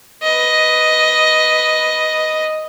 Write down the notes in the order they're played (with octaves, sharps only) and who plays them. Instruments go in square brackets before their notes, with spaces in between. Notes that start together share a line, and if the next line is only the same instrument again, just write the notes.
[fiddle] B4 D#5